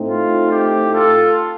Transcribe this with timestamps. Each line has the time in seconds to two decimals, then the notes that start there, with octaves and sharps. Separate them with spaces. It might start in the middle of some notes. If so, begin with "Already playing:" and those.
Already playing: A2 A3 C4 D#4
0.08 F4
0.51 G4
0.93 F4 A4